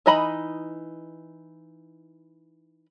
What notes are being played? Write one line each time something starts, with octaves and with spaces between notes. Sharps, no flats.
E3 D#4 D#5 A#5 B5